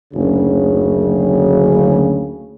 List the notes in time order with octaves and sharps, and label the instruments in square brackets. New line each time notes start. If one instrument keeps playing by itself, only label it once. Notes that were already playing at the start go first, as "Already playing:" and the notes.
[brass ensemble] F#1 D2 C#3